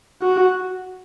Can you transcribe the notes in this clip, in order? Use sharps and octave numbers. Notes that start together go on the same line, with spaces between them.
F#4